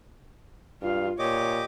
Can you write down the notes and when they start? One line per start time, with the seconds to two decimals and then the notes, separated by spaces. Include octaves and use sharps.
0.82 G2 F4 F5
1.19 A#2 G4 C#5 D#5 D6